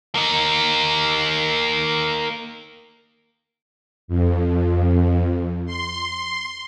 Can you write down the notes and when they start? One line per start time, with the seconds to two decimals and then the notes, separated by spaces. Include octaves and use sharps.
0.15 A#3 D#4
4.08 F2
5.66 C6